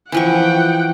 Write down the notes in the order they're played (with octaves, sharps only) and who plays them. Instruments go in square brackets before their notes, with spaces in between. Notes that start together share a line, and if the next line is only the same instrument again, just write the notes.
[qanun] E3 F3 C#6 [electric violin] F#5 G5